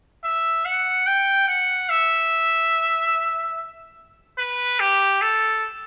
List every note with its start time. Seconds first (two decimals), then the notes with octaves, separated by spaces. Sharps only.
0.24 E5
0.65 F#5
1.07 G5
1.48 F#5
1.89 E5
4.38 B4
4.80 G4
5.22 A4